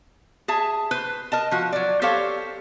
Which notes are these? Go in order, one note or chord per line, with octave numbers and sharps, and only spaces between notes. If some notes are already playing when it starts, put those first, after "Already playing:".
G#4 E5 A5
B4 C5
A#4 D#5 A5
F3 F#4
F#3 D5
G4 A4 C5 C#5 F5